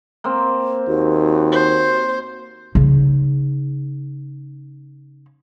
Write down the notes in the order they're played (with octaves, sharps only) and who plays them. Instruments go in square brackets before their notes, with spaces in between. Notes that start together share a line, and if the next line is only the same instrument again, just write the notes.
[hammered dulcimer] A#3 C4
[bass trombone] D#2 [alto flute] F#4
[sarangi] C5
[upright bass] C#3 D#4